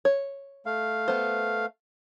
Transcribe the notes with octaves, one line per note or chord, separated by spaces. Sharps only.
C#5
A3 F5
B3 C5